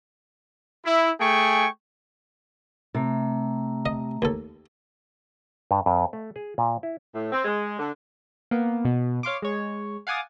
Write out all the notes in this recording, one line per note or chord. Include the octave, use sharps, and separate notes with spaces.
E4
A3 G#4 G5 G#5 C#6
C3 A3 A#5
D#5
D#2 A4
G2
F2
A3
G#4
A#2
E4
A2
C4
G#3
D3
A#3 B3
B2
C#5 F5 C6 D6
G#3 C#5
F5 F#5 G#5 D6 D#6 A6